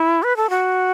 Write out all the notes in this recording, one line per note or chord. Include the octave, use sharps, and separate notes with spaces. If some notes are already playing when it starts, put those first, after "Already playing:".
Already playing: E4
B4
A4
F#4